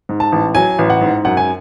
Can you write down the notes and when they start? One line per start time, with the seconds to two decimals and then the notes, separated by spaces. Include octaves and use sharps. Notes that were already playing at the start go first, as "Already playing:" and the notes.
0.09 G#2
0.20 A5
0.32 A1
0.55 F#3 G#5
0.79 A1
0.90 F#5
1.01 G#2
1.25 F#2 F#5
1.37 G#5